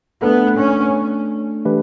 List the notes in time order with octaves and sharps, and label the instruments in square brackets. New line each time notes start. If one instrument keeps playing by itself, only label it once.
[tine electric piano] A3 D4 A4 [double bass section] B3
[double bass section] C#4
[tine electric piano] E3 A3 D4 G4 B4